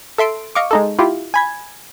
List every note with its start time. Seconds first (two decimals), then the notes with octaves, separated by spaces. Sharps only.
0.18 A4 E5 C6 D7
0.55 D#5 F5 C#6 D6
0.71 G#3 D#4 A4
0.99 E4 F4 G4
1.34 G#5 B5 G#6